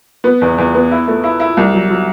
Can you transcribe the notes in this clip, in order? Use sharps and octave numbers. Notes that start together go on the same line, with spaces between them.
B3
E2
E2
B3
E4
A3
E4
E4
C2
F#3
F#3